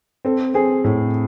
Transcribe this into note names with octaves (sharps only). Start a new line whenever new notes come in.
C4 A4
C4 G#4
A2 A4